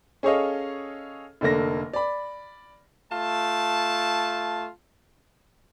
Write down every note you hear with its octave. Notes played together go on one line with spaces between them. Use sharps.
C#4 G#4 A4 C#5 D#5 F5
F1 D3 A3 A#3 A#6
D5 B5
A3 F4 A5